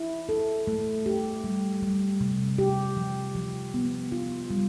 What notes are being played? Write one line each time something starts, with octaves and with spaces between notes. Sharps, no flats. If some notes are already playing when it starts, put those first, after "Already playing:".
Already playing: E4
A4
A3
G4
G3
G3
C3
G4
F3
F3
B3
F4
G3